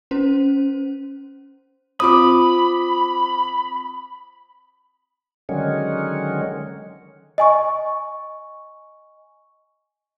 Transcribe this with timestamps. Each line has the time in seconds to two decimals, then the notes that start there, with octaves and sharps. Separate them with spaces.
0.11 C#4 C5
2.00 C4 F4 B5 D6 D#6
5.49 D3 D#3 F#3 G#3 C#4
7.38 D#5 G#5 C#6